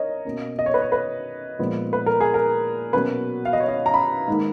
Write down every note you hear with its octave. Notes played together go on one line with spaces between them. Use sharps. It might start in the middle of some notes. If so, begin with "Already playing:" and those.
Already playing: A#4 C#5 D#5
B2 A#3 C#4
D#5
C#5
B4
C#5
B4
A#2 F3 G#3 B3
B4
A#4
G#4
A#4
B2 F#3 A#3 C#4 B4
F5
D#5
C#5
D#5
A#5
B5
G#2 D#3 A#3